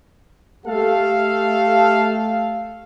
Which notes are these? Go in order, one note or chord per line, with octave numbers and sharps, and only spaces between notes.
A3 G4 A4 F5